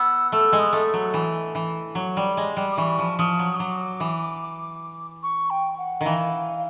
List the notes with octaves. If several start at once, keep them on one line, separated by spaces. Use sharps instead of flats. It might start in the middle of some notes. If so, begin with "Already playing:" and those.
Already playing: B3 E6
A3 E6
G#3
D#6
A3
F#3
E3
E3
F#3
G3
G#3
G3
D6
E3 C#6
F3
F3 D#6
F#3
C#6
F#3 D6
E3
C#6
G5
F#5
D#3 E3 F5